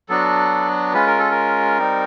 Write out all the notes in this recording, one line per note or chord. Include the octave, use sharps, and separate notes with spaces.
F#3 B3 D4 F#4 A4
G#3 C#4 F4 B4
A#4
A4
A#4
G3 C4 D#4